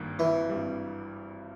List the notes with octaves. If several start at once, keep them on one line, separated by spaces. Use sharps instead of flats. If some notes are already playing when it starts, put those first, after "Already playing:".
Already playing: G#1 G2 D#3 A#3
E3
G#1 G2 G3